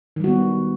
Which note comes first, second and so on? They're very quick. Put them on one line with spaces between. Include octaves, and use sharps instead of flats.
D#3 G3 F#4 B3